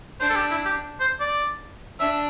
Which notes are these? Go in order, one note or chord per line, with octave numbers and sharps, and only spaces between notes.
D4 C5
A4
G4
E4
G4
C5
D5
D4 E5